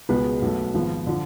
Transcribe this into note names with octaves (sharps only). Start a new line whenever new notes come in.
C#2 B2 G#3 B3 B4
B1 B2 A3
G#1 G#2 F3 B3
D3 F3